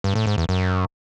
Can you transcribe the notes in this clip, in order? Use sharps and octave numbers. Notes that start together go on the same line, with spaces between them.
G2
A2
G#2
E2
F#2